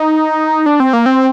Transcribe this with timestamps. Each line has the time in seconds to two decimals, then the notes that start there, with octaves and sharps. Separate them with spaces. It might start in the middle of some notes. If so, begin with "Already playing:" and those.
Already playing: D#4
0.66 D4
0.80 C4
0.93 A#3
1.06 C4